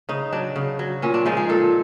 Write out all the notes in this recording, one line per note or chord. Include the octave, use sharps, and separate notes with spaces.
C#3 D#4
F#3 D4
C#3
F#3
A#2 C#4
D4
F3 G#3 D#4
G#4
A#2 A4